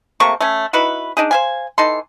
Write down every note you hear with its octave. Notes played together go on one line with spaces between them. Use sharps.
C3 A3 A#3 C#6
A3 C#4
D#4 E4 F#4 B4
D4 D#4 G#4
C5 F5 G#5
E3 D#4 A4 C6